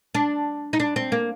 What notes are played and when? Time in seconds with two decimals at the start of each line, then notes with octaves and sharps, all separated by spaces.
0.15 D4
0.73 D#4
0.80 D4
0.96 C4
1.12 A#3